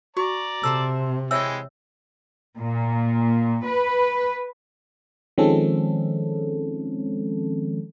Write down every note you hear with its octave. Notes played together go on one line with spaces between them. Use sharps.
F#4 D5 A#5 C#6
C3 A4 C5 E5 E6
E3 G#3 C#5 E5 G5 E6
A#2
B4
D#3 F3 G#3 C4 C#4 A4